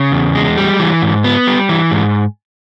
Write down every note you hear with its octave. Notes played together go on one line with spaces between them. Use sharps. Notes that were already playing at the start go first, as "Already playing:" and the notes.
Already playing: C#3
E2
G#3
G3
E3
G#2
B3
G3
E3
G#2